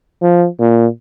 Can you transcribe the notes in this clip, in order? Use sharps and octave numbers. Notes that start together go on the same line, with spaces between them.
F3
A#2